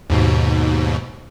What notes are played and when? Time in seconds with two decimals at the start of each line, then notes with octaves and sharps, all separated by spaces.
0.10 D#2 G#2 B2